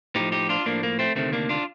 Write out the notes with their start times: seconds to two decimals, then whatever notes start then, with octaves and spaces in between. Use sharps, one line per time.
0.16 A2 F3 D#4 G4
0.32 D#4 G4
0.49 D4 F4
0.66 A2 F3 A#3 D4
0.83 A#3
0.99 A3 C4
1.15 D2 C3 D#3 A3 C4
1.33 A#3 D4
1.49 D4 F4